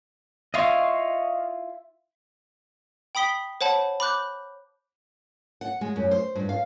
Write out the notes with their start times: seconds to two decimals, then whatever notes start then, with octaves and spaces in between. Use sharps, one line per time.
0.54 E4 F4 D#5 F5 C6 C#6
3.15 G5 B5 D#6 B6 G7
3.61 C5 C#5 F#5 A5 B5
4.00 B5 D6 F#6 G6
5.61 F#5
5.81 G#3
5.96 F#2
6.11 C5
6.36 G2
6.49 F5